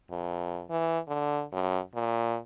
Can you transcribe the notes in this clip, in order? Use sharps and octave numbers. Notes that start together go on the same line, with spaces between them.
F2
E3
D3
F#2
A#2